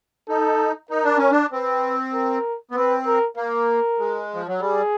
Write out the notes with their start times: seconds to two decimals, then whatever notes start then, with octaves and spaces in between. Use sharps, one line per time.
0.29 D#4 A4
0.91 D#4 A#4
1.04 D4
1.18 C#4
1.31 D4
1.52 C4 B4
2.14 A#4
2.71 B3
2.76 C4 B4
3.06 A#4
3.37 A#3 A#4
3.99 G#3
4.34 F3
4.48 F#3
4.61 G3 G#4